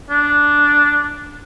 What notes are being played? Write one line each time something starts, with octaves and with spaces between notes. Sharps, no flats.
D4